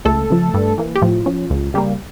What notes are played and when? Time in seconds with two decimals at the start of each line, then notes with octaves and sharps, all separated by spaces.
0.05 C#2 A3 A4
0.30 C#3 F3
0.54 G2
0.78 E3 A#3
0.96 G4
1.02 A2 F3 F4
1.26 F3 C#4
1.50 C#2
1.74 C#3 G3 A#3